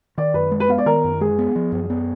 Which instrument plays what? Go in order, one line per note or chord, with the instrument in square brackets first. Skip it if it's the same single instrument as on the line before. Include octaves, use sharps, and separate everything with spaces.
[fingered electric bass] D#3 [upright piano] D5
[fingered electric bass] F#2 [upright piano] B4
[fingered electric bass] G#3
[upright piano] B4
[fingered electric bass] B3 [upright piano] F5
[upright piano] D5
[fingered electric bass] D#3 [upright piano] A#4
[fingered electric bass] F#2
[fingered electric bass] G#3 [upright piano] G#4
[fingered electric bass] B3
F3
F#2
B3